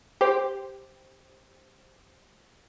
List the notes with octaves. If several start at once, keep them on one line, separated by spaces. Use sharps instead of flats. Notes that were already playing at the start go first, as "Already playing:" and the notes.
G4 C5